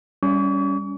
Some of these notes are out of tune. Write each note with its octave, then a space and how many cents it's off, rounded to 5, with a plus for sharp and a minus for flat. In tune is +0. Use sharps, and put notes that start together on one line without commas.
G3 +0 C#4 +20 C#6 +45